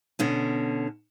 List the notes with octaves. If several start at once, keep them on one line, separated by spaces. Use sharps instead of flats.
B2 D3 C#4